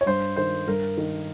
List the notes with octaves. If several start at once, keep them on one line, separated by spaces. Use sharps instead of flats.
C#5
G2 C5
D#3 C5
G2 A#4
D#3